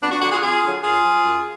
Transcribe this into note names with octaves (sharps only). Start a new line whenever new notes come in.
F2 B3 D4
D4 F#4
D3 F#3 D4 F#4
F4 G#4
F2 F4 G#4
D3 F#3
F#2 F4 G#4
F3
F#2